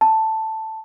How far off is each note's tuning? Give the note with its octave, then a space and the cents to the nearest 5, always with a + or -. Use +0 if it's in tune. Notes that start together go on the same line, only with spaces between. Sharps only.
A5 +5